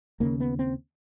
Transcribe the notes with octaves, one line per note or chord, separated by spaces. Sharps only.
D#2 C#3 A#3
B3
C4